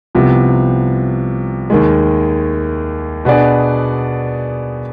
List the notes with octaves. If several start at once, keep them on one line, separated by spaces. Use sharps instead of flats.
C2 C3 F3 B3
D#2 D#3 G#3
B2 B3 D4 G#4 D5